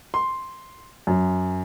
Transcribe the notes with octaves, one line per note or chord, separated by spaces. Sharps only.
C6
F#2